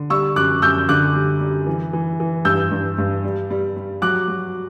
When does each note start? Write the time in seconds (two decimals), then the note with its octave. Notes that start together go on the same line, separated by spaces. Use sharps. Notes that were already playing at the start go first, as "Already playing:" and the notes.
Already playing: D3
0.10 G3 C#6 E6
0.36 F#2 D6 F#6
0.62 F#2 E6 G6
0.89 D3 D6 F#6
1.15 G3
1.41 G3
1.67 E3
1.93 E3
2.20 E3
2.45 G2 E6 G6
2.71 G2
2.98 G2
3.24 G3
3.50 G3
3.77 G3
4.02 F#3 D6 F#6
4.28 F#3